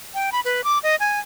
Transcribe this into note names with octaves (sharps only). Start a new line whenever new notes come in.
G5
B5
B4
D6
D#5
G#5